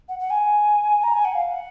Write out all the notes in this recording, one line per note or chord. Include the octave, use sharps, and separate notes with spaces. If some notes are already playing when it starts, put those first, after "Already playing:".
F#5
F#5
G#5
A#5
G#5
F#5
F5
F#5